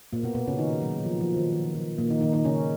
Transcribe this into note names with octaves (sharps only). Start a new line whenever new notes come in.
A#2 A#3
B2 B3
B2 B3
C#3 C#4
D#3 D#4
F#3
F3
F3
D#3
D#3
F3
A#2 A#3
D#3 D#4
D#3 D#4
D#3 D#4
C#3 C#4